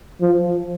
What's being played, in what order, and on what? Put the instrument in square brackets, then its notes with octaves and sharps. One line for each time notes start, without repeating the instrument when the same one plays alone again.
[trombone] F3